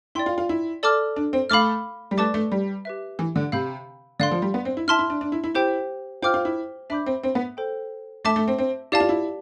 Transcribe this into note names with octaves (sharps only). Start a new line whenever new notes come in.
E4 D5 G5 C6
F4
F4
E4
A4 D5 A5 D6 F6
D4
C4
A3 F5 B5 D6 F6
G3
A3 B4 D5 A5 D6
A3
G3
G4 B4 E5
E3
D3
C3 F5 B5 E6 G6
D3 D5 F5 C6
F3
G3
B3
C4
E4
E4 E5 A5 C6 F6
E4
D4
D4
E4
E4
E4 G4 C5 G5
F4 C5 G5 D6 F6
F4
E4
D4 E5 B5 D6 G6
C4
C4
B3
A4 C5 G5
A3 E5 A5 D6
A3
C4
C4
E4 G4 D5 F5 A5
F4
E4